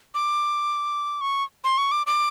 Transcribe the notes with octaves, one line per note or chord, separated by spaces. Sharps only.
D6
C#6
C6
C#6
D6
D6